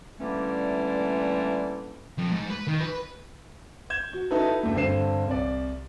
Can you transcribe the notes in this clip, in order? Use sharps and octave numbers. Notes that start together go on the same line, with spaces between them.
D3 E3 G3 A3 A#3 C#4
F2
G#2
B4
D#3
B4
G6 G#6 E7
F#4
D#4 E4 F#4 A4 B4
F#1 D2 A3
G2 D3 C4 C7 E7
C2 D5